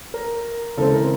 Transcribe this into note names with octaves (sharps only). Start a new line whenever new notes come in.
A#4
C#3 E3 G#3 C4 A4
A#4